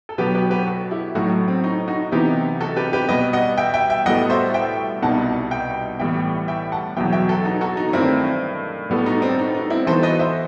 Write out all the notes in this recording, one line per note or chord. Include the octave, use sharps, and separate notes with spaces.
A4
B2 F#3 B3 G4 B4
G4 B4
G4 B4
F#4 A4
E4 G4
A2 F#3 A3 D#4 F#4
C4
D#4
D#4 F#4
C3 E3 B3 D#4 E4 G4
F#4 A4
G4 B4
G4 B4
B2 G3 B3 B4 D#5
D#5 F#5
E5 G5
E5 G5
E5 G5
A2 G3 B3 F#4 A4 D#5 F#5
C5 E5
E5 G5
C2 B2 G3 B3 D#4 F#5 A5
E5 G5
A2 E3 G3 B3 E5 G5
E5 G5
F#5 A5
E2 B2 F#3 B3 E5 G5
E5 G5
F#4 A4
D#4
F#4 A4
D#4
D#4
G2 D#3 A3 C4 E4
A2 G3 B3 F#4 A4
D#4
C4
D#4
D#4
C4 E4
E3 B3 D#4 F#4 A4 C5
B4 D#5
C5 E5